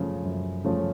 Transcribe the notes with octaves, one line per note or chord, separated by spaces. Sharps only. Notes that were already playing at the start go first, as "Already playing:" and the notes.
Already playing: F#2 C#3 F3 A3 C#4
F#2
C#3 F3 A3 C#4